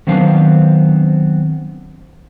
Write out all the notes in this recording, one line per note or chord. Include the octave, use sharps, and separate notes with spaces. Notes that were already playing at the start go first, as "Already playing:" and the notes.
D#3 F#3 B3 C4 D4 F5